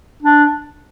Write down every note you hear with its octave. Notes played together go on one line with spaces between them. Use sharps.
D4